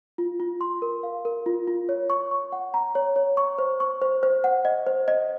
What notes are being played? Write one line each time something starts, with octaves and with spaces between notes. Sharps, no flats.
F4
F4
C6
A#4
F5
A#4
F4
F4
C#5
C#6
C#6
F#5
A#5
C#5
C#5
C#6
C5
C#6
C5
C5
F#5
D#5
C5
D#5